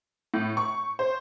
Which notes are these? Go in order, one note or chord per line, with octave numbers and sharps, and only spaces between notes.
A2
C#6
C5